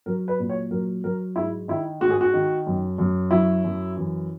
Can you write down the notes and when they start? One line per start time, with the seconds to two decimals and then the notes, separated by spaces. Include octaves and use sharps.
0.06 F#3 A#4
0.28 B4
0.39 A#2
0.49 C#5
0.71 F#3 A#4
1.04 F#3 A#4
1.36 G#2 E4
1.68 D#3 E4
2.01 G#2 F#4
2.10 G#4
2.21 F#4
2.33 D#3
2.67 F#2
2.98 F#2
3.31 F#3 E4
3.64 F#2
3.97 E3